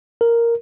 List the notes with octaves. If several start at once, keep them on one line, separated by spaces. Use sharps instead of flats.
A#4